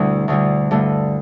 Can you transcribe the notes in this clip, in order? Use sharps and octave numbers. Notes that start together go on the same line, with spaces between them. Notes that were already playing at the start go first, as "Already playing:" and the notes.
Already playing: D2 B2 D3 G3 A3 E4
D2 D3 G3
G2 D3 A3